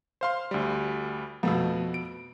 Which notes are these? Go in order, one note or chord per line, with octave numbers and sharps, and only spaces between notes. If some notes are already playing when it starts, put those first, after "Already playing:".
C5 F5 C6
D2 G3
F2 B2 A3 B3
D7